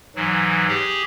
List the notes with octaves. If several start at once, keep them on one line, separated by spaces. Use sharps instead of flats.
G#2 E3 F#3
G4 G#4